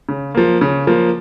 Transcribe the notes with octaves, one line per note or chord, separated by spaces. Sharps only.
C#3
F3 A#3
C#3
F3 A#3